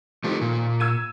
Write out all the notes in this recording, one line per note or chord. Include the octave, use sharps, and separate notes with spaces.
D#3 F3 A3 G4 A4
A#2
E6 G#6 D#7